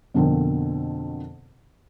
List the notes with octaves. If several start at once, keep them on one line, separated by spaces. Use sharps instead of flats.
F2 B2 D3 A#3 C4